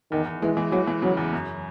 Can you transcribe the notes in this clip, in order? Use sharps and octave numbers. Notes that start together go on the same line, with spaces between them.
E2 D#3
E2
E3 G#3
E3
E3 F#3
E3
C#3 F#3
E2
F#2